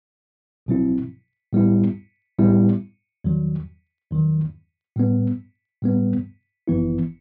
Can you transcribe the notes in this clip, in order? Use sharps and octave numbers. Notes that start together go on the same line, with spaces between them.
B1 B2 F#3 C4 E4
A2 G3 B3 E4
A2 G3 B3 E4
E2 D#3 F#3
E2 D#3 F#3
A2 G3 B3
A2 G3 B3
G1 F#2 E3 B3 E4